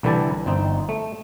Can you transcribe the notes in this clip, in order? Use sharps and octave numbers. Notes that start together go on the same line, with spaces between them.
C2 D3 E3 E4 G4 A5
G1 C4 D#4
A3